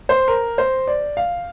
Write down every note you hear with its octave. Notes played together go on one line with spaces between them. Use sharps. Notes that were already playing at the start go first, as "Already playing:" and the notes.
C5
A#4
C5
D5
F5